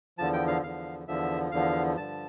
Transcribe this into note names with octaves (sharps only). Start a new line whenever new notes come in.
E2 D3 F3 A5
G5
F5
E2 D3 F3 F5
E2 D3 F3 E5
E2 D3 F3 F5
G2 D3 F3 A5